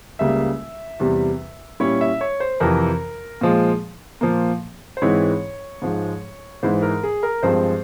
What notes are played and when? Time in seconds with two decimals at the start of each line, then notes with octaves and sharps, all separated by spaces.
0.19 C#2 C#3 G3 A#3 E5
1.00 E2 C3 G3
1.80 A#2 G3 C#4 E4 C#5
2.01 E5
2.21 C#5
2.40 C5
2.60 F2 C3 E3 A#4
3.41 A#2 F3 G#3
4.21 A#2 F3 A#3
4.97 C5
5.02 G#2 E3 G#3 C4 E4 C#5
5.82 G#2 F3 G#3
6.63 G#2 E3 G#3 E4 C5
6.82 A#4
7.03 G#4
7.23 A#4
7.43 G2 F3 G#3 C4 C5